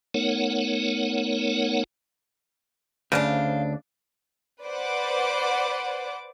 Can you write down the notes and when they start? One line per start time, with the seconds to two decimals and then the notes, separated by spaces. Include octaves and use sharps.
0.14 A3 B3 D#4 A#4 C#5 F#5
3.12 D2 C#3 D4 C5 F5
4.63 B4 C5 D5 F#5 D6